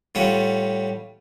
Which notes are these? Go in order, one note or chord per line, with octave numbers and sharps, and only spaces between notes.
A2 G3 F4 F#5